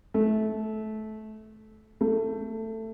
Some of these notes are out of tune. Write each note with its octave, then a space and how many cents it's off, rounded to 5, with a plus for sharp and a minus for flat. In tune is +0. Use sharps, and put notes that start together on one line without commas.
A3 -20
A3 +15